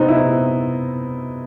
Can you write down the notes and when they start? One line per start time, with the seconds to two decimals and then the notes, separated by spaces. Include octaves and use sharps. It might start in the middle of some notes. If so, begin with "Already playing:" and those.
Already playing: C3 B3 C4 D#4
0.08 E4